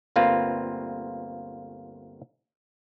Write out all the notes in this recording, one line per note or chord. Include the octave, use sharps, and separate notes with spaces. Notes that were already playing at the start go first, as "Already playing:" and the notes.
G1 D2 A#3 C4 F4 B4